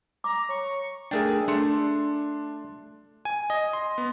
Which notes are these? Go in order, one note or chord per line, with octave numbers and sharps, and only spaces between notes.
A#5 D6
C#5 C#6
A3 D4 G#4 A#4 G5
A3 D4 C6 C#7
G#5
D#5
C6
B3